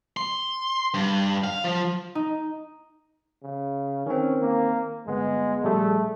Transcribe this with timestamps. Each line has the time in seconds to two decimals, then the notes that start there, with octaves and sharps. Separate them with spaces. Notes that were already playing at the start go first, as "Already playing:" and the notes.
0.17 C6
0.94 G2
1.44 F5
1.64 F3
2.15 D#4
3.43 C#3
4.06 D#3 C4 C#4
4.40 A#3
5.07 G1 G#3 B3
5.63 A#1 G3 A3 G#4